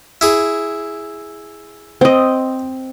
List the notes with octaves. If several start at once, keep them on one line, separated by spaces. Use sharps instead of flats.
E4 G#4
C4 D#5